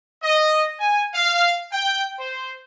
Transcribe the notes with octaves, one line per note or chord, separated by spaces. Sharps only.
D#5
G#5
F5
G5
C5